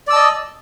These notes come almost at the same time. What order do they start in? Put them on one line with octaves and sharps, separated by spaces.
D5 E6 A5 D#5